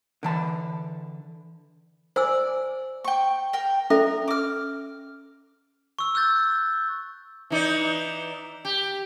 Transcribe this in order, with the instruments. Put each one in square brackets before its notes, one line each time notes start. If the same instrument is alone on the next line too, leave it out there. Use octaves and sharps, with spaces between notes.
[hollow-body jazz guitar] D3 E3 A5
[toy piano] C5 G#5 E6 [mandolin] D5
[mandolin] G5 C#6
A#4 G5
[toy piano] C#4 A4 E5 [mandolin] A#4
[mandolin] D6 F6
[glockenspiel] C#6 E6
E6 F#6 G6 A6
[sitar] E3 D#4 D5
G4